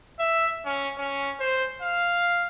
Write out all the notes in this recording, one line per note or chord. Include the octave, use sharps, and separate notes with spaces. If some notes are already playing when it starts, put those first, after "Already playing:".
E5
C#4
C#4
C5
F5